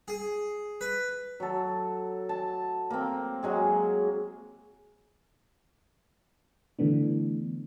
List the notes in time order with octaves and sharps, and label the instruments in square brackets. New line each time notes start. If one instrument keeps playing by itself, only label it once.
[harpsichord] G#4
B4
[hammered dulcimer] F#3 A4
A5
A#3 C4
F#3 G#3 G#4
[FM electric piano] D3 E3 A3 B3 D4